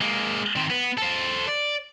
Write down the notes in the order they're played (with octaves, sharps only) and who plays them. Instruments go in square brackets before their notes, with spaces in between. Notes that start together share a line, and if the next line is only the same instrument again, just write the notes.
[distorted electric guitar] G#3 A#3
D#3 C4
B3
A4 C5
D5